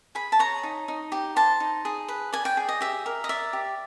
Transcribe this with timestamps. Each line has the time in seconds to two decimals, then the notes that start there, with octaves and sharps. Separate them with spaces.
0.15 G#4 B5
0.32 A5
0.39 C#5 A#5
0.63 D#4
0.88 D#4
1.12 G4
1.36 C5 A5
1.60 D#4
1.85 G#4
2.08 B4
2.32 D5 G#5
2.45 G5
2.57 G#4
2.69 D#5
2.81 G4 E5
3.06 A#4
3.24 D#5
3.29 D5 E5
3.53 G4